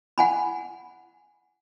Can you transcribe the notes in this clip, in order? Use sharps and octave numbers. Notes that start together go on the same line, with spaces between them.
F#5 G#5 B5